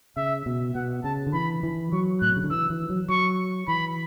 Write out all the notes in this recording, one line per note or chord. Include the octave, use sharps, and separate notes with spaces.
C#3 E5
B2
B2 F#5
C#3 A5
D3
E3 B5
E3
F#3 C#6
A2 F#6
B2
C#3
D3
E3 E6
E3
F#3
F#3 C#6
E3 B5